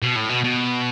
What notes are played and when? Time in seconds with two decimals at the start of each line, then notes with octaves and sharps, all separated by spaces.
0.02 B2
0.16 A2
0.29 B2
0.44 B2